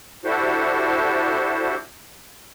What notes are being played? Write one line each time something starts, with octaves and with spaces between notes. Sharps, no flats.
D4 E4 F#4 G4 A4 C5